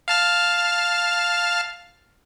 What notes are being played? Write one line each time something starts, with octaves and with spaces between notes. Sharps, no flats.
F5 A5 F6